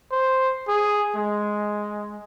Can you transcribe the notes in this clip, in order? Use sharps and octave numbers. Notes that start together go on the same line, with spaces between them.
C5
G#4
G#3